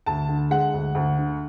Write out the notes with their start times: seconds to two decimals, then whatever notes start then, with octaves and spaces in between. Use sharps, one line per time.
0.06 D2 A5
0.28 D3
0.50 G#3 F#5
0.74 D2
0.95 D2
1.17 D3